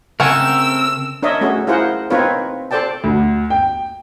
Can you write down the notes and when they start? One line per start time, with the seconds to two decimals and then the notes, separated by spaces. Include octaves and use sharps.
0.20 C#3 A3 C4 A#4 F#5 G#5 E6
1.23 D4 A#4 C#5 D#5 E5
1.41 A3 C#4 F#4 G#4
1.67 E4 F4 G#4 A#4 C5 F#5
2.10 C4 D#4 F4 A#4 B4 C#5
2.71 A4 C5 D5 G5 A5
3.04 D2
3.50 G5